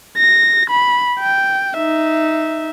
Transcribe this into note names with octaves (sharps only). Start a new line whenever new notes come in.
A#6
B5
G5
D#4 E5